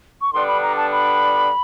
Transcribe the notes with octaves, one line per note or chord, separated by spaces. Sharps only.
C#6
D3 G3 B3 D4 C6
B5
A#5
A5
B5